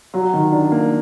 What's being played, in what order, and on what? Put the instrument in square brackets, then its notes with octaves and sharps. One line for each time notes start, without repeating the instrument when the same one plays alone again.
[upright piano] F#3
D#3
D4
A#3